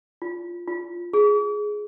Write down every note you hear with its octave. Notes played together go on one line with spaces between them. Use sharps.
F4
F4
G#4